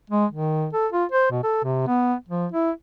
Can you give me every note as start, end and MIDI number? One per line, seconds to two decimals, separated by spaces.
0.10 0.26 56
0.32 0.68 51
0.73 0.88 69
0.93 1.05 65
1.12 1.29 72
1.31 1.43 47
1.43 1.61 69
1.64 1.83 48
1.87 2.15 59
2.29 2.47 53
2.52 2.71 64